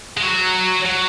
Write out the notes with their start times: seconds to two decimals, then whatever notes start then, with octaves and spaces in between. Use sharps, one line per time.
0.17 G#3
0.22 F#3
0.85 F#3